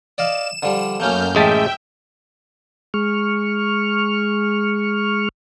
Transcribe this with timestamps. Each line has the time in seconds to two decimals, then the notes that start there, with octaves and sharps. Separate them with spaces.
0.18 D5 D#5 F5 E7
0.63 D3 F3 G3
1.00 F#2 A3 A#3 C#4 F6 G6
1.35 A1 G#3 E5 G5 A5
2.94 G#3 C#6 F6